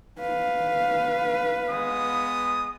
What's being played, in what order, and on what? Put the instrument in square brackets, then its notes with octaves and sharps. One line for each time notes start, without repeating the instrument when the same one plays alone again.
[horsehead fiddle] B4 F5
[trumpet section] G#3 B3 D#6